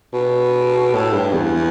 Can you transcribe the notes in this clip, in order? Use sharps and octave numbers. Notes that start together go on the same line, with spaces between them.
B2
A2
G2
E2